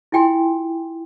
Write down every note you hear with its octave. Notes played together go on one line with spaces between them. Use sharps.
E4 F4 G5 G#5 C6